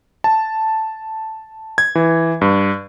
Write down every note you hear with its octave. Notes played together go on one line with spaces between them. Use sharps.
A5
G#6
E3
G2